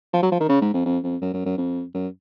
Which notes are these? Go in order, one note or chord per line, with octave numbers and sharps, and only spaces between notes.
F3
F#3
F3
D#3
C#3
G#2
F2
F2
F2
F#2
F#2
F#2
F2
F#2